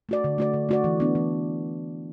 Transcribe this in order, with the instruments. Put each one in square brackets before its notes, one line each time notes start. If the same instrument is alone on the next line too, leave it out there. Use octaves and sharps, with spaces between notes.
[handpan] A3 F#4 D5
D3
A3 F#4 D5
D3
A3 F#4 D5
E3
B3 D4
E3